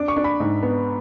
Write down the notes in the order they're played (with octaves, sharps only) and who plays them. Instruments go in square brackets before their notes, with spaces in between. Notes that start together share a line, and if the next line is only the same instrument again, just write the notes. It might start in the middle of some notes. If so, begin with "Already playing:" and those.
Already playing: [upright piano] D4 D6
C#6
D4
B5
G#2
B3